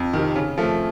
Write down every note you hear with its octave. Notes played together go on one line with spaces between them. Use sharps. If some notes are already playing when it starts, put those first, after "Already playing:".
Already playing: F2
C3 D#3
C#3
F3 A3